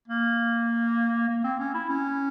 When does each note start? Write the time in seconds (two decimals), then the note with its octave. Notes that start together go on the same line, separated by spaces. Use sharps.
0.08 A#3
1.29 A#3
1.44 C4
1.59 C#4
1.74 E4
1.89 C#4